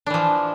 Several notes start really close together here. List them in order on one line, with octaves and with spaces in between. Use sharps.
D4 E3 F3